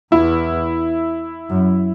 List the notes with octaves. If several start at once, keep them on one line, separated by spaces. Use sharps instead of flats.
E2 E4
F#2